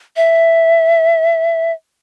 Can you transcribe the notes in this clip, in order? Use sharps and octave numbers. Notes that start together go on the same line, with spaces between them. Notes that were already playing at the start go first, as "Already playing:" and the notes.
E5